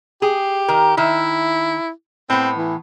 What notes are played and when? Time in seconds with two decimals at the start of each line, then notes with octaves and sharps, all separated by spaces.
0.22 G4 G#4
0.68 D#3 A#4
0.97 D#3 E4 E5
2.30 A2 B3 C4
2.57 E3